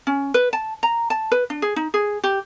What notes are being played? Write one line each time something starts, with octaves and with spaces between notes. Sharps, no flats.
C#4
B4
A5
A#5
A5
B4
D4
G#4
D#4
G#4
G4